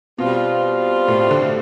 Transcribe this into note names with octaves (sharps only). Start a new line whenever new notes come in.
B2 G3 C4 F4
A2
D3